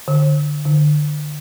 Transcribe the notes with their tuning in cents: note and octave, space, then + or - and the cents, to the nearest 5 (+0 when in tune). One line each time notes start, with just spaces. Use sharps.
D3 +10
D3 +25